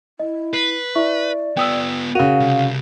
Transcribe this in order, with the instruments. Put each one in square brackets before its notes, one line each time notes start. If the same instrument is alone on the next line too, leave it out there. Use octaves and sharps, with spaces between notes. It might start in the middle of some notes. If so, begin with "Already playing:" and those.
[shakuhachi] E4 [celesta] D#5
[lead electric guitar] B4 [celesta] C7
[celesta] E4 E5 C#6 [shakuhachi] D5
[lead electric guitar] B3 F4 [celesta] G5 D#6 E6
[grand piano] C#3 F#4 [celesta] A#4 D#7 F7 [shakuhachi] F5
[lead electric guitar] C2